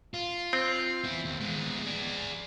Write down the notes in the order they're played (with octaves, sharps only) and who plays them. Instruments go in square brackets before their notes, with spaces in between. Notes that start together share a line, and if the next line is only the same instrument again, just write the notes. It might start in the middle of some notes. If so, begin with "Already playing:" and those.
[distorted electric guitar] F4
[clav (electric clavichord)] C4
[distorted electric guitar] B3 E4
D#2
G#3 B3
G#4 D5